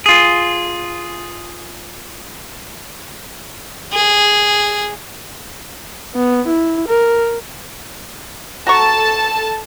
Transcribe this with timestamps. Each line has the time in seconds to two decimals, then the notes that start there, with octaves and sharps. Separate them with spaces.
0.06 F4 G#4
3.93 G#4
6.15 B3
6.47 E4
6.88 A#4
8.67 F#4 A4 A5 A#5 C#6